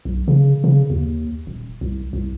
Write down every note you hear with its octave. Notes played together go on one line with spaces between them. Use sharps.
B1
C#3
C#3
D#2
D#1
C2
C2